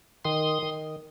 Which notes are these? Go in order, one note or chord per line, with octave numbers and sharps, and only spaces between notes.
D#3 C6 D#6
D#3